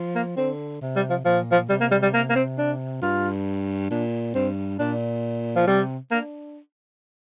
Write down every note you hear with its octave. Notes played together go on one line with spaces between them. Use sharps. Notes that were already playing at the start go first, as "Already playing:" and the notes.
Already playing: F3
A#3
D3 C4
C3
G3
F3
A#2 F3
F3
C3 G3
A#3
G3
G3
A#3
A#3
C4
D4
G2 F4
A#2 D4
G2 C4
A#2 D4
F3
C3 G3
A#3 D4